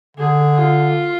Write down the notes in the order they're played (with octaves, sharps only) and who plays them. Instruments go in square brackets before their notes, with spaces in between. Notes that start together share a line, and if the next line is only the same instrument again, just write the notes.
[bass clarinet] D3 [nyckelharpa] G#4
[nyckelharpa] F4